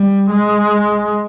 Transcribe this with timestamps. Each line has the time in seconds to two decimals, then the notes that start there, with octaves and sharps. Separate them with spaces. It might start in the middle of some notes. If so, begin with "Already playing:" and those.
Already playing: G3
0.30 G#3